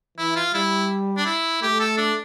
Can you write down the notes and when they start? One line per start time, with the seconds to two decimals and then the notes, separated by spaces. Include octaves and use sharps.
0.18 E3 E4
0.36 F4
0.54 G3 E4
1.18 D4
1.26 E4
1.62 A3 G4
1.80 A4
1.98 D4